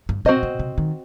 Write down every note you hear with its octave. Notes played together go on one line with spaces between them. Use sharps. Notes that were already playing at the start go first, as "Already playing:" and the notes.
G2
B2 C4 F#4 C5 D#5
B2
C3
D#3